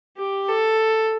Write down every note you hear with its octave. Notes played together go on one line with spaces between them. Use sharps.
G4
A4